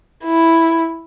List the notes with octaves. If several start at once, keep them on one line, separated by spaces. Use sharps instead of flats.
E4